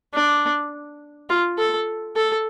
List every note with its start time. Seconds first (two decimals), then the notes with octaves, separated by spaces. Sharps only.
0.14 D4
1.30 F4
1.58 A4
2.16 A4